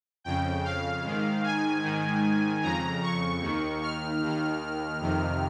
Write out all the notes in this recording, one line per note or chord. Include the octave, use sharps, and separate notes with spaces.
F2 C#3 G5
F5
G#2 D#3
G#5
G#2 D#3
F2 C#3 A#5
C#6
D#2 D#3
F6
D#2 D#3
F2 C3 D#3